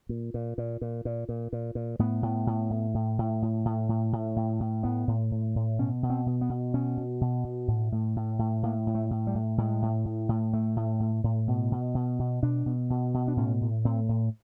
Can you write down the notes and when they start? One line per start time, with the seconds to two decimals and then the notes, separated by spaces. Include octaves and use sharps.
0.09 A#2
0.34 A#2
0.58 A#2
0.81 A#2
1.05 A#2
1.29 A#2
1.53 A#2
1.75 A#2
1.99 A2 B3
2.23 A2
2.47 A2
2.70 A2
2.94 A2
3.19 A2
3.42 A2
3.65 A2
3.89 A2
4.13 A2
4.36 A2
4.60 A2
4.83 A2 B3
5.07 A2
5.31 A2
5.55 A2
5.79 B2 C#4
6.03 B2
6.10 C4
6.26 B2
6.41 B3
6.49 B2
6.74 B2 C#4
6.97 B2
7.21 B2
7.44 B2
7.68 A2
7.92 A2
8.16 A2
8.39 A2
8.63 A2 A#3
8.87 A2
8.95 A3
9.11 A2
9.27 G3
9.35 A2
9.58 A2 G#3
9.82 A2
10.05 A2
10.29 A2
10.53 A2 A3
10.76 A2
11.00 A2
11.24 A2
11.48 B2
11.72 B2
11.95 B2
12.19 B2
12.42 B2 D4
12.66 B2
12.90 B2
13.14 B2
13.28 D4
13.37 A2 C#4
13.61 A2
13.85 A2 C4
14.09 A2